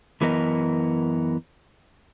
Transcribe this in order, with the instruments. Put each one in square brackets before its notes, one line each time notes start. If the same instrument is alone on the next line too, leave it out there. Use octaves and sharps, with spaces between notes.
[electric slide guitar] F#2 E3 B3 A#4 D#5